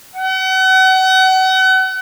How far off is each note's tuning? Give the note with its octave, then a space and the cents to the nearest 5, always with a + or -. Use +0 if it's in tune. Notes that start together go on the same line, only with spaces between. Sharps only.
F#5 +35